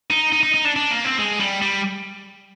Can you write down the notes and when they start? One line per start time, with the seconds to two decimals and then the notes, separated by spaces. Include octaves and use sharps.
0.11 D#4
0.33 D#4
0.43 D#4
0.54 D#4
0.65 D4
0.76 D4
0.91 A#3
1.05 C4
1.19 G#3
1.40 G3
1.62 G3